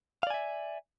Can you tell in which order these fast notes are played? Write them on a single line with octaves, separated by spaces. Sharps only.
F5 D5 G#5 E5